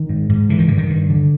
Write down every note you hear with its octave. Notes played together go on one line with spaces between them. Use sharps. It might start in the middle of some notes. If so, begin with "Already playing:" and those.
Already playing: D#3
G#2
G#2
D3 E3
D#3
G2 D3
D#3
G2
D3